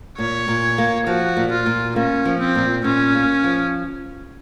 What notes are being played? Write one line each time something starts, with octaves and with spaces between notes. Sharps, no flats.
A#2 C#5
A#2
A#3
F3 F#4
A#2
F4
A#2
A#3 C#4
F3
C4
A#2
A#2 C#4
A#3
F3